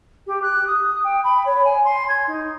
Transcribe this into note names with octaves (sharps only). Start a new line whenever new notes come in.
G4
F#6
D#6
G5
B5
C#5
G#5
C6
G#6
D#4